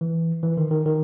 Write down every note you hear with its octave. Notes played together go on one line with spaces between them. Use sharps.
E3
E3
D#3
D#3
D#3